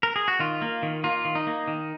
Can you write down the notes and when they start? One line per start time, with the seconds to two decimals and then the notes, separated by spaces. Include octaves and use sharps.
0.03 A#4
0.16 G#4
0.28 F#4
0.40 D#3 F4
0.62 A#3
0.83 D#3
1.04 A#3 F4
1.25 D#3
1.35 D#4
1.47 A#3
1.68 D#3